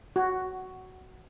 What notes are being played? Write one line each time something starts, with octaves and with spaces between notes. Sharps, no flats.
F#4